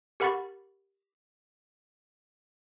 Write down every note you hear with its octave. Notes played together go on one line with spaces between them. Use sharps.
G4 A#4 F#5 B5 C#6 A6